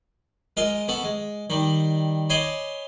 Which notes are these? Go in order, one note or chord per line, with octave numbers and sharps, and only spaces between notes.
G#3 F4 A#4 D#5
B3 F#4 A4
G#3
D#3 G3
C#5 D#5 G#5 B5 C6 D6